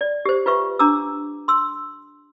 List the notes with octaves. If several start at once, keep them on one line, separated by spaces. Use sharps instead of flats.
D5
G4 C5
F4 B4 E5 C#6
D4 A#5 D6 E6
C6 E6